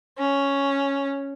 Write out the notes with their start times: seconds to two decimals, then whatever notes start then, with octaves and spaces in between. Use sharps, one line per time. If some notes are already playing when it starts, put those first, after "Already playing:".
0.19 C#4